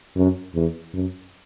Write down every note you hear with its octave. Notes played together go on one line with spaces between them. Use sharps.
F#2
E2
F#2